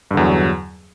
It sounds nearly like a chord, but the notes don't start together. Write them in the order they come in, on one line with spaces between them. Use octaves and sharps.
G2 D3 E2 F#3